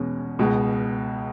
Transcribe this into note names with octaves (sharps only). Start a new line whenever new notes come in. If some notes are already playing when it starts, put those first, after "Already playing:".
Already playing: E2 B2 G#3 C#4
C#2 B2 G#3